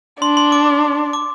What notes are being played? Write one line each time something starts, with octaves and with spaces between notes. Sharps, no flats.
D4 C6
C6
D6
D6